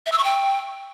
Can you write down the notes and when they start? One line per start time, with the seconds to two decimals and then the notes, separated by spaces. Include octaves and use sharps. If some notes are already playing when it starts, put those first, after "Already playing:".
0.06 E5
0.12 E6
0.18 C#6
0.24 G5